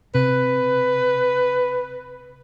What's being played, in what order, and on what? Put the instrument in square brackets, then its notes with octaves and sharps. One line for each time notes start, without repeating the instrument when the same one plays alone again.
[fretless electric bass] C3 [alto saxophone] B4